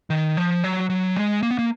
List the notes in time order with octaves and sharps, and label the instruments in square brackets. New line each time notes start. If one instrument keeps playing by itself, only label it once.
[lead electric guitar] D#3
F3
F#3
F#3
G#3
A#3
B3
A#3